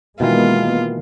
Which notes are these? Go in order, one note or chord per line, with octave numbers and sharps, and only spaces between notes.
B2 D#3 E3 G#3 A#3 B3 F4